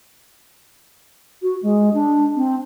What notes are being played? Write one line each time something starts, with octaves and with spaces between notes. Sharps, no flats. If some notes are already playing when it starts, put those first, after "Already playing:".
F#4
G#3
D4
C4